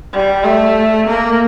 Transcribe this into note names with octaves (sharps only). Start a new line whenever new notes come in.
G3
A3
A#3